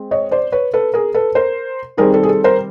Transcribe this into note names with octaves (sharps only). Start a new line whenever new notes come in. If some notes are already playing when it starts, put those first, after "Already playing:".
Already playing: G#3 C4
C#5 D#5
C5 D5
B4 C#5
A4 B4
G#4 A#4
A4 B4
A#4 C5
D#3 G3 C4 G#4 A#4
A4
G#4
A4
A#4 C5